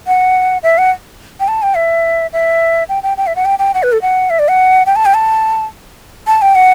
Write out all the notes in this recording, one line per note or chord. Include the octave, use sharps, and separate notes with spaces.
F#5
E5
F#5
G5
A5
G5
E5
E5
G5
G5
G5
E5
F#5
G5
G5
F#5
B4
A4
F#5
E5
D5
F#5
G5
A5
G5
A5
A5
G5
F#5